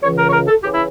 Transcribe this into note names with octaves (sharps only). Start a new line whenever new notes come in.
C#2 C#3 E3 C#5
A#4
C#5
A#4
A4
C#3 E3 G4
E4